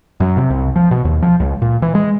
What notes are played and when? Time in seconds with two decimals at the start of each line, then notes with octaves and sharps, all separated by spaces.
0.20 F#2
0.37 C3
0.50 C2
0.76 F3
0.91 B2
1.05 D#2
1.22 F3
1.40 C#2
1.62 A#2
1.82 E3
1.95 G#3